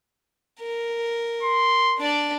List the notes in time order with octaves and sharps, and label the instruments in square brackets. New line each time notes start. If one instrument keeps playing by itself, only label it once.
[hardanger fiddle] A#4
[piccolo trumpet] C6
[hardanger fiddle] D4 D5